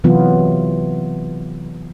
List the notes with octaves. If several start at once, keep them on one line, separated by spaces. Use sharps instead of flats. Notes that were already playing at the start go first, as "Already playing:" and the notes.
C3 E3 F#3 B3 F4